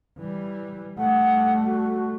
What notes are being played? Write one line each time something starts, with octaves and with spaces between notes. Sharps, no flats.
E3 G3
G3 A3 F#5
F#4